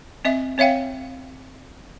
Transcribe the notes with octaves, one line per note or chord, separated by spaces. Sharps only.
C4 D#5 E5
C4 C#5 E5 F5 G5